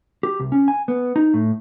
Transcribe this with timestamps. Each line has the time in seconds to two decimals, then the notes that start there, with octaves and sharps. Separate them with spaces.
0.23 G4
0.39 C2
0.52 C#4
0.68 G#5
0.88 B3
1.16 D#4
1.34 A2